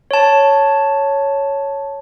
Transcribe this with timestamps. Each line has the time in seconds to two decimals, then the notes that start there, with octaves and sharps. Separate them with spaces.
0.11 C#5 A5